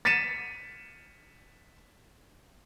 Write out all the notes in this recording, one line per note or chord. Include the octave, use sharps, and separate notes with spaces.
A6 B6 C#7 D#7 E7